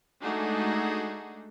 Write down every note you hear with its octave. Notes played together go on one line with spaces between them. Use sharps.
G#3 A3 D4 D#4 F#4 G#4